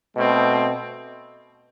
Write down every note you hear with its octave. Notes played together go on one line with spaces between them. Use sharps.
B2 A3 C4